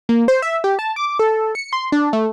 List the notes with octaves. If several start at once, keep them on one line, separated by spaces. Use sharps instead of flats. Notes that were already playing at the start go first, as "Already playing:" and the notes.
A#3
C5
E5
G4
A5
D6
A4
C#7
C6
D4
A3